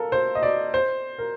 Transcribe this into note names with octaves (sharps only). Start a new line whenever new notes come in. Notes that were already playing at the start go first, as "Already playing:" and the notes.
Already playing: A4 A#4 F5
C5
D#5
D5
C5
A#4